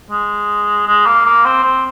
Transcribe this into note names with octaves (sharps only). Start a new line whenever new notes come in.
G#3
G#3
A#3
A#3
C4
C4